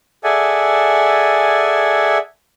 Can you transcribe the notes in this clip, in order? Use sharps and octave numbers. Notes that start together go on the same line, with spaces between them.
G#4 A4 D5 E5 F#5 G#5